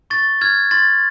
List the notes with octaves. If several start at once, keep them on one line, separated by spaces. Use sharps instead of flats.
C#6 A6
F6 G#6
C6 A6